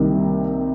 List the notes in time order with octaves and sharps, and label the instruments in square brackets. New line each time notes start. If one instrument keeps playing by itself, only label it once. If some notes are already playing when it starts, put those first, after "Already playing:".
Already playing: [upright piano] C2 C3 D#3 A#3